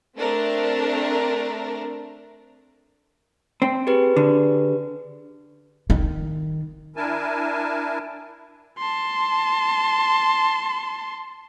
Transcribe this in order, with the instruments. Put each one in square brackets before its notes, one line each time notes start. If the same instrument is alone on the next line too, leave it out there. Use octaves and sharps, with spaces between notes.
[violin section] A3 C4 D4 A#4
[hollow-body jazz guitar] C4
[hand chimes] G4 G#4 B4
[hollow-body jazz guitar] D3
[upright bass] D#3
[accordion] D4 E4 A#4 G#5 A5
[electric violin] A5 C6